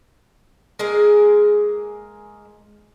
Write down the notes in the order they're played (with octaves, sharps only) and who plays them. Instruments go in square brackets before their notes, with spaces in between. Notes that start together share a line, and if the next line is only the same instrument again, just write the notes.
[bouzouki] G#3 A#3 G#4 A#4